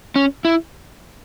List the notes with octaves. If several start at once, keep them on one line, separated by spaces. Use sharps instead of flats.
C#4
E4